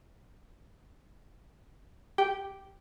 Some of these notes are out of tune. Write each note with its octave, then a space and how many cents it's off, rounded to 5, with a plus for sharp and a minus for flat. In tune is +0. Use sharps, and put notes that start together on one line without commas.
G4 +0 G5 -10